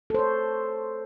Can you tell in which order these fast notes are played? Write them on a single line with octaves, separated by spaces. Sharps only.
A4 C5 C#5